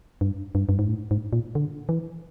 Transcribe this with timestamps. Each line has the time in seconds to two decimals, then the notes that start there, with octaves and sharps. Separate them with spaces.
0.21 G2
0.55 G2
0.69 G2
0.79 G#2
0.88 A2
1.11 G#2
1.33 A#2
1.55 D3
1.89 E3